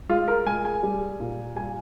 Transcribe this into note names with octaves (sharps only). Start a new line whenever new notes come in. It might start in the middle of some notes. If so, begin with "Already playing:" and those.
G#3 F4
A#4
G#3 G#5
G#5
G3
A#2
G3 G#5